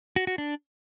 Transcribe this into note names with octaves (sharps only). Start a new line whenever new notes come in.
F#4
F#4
D4